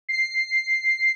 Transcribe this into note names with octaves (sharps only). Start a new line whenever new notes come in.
C7